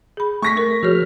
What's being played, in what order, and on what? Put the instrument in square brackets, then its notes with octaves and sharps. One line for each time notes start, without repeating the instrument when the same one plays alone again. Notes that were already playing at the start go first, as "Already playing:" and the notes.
[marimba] G#4 B5
[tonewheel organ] A3 [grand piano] C#6 A#6 B6
[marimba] A#4
[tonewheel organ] F3 F6 [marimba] F#4 G#4 C#5